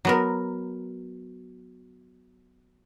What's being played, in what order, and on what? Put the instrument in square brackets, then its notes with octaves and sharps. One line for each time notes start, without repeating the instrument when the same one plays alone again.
[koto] F#3 B3 A#4